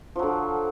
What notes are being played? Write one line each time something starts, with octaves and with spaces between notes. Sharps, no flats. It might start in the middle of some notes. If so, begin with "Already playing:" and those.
D3 F3 F#3